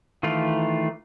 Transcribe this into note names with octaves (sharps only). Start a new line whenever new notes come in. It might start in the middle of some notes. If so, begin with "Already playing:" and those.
D#3 E3 A3 F4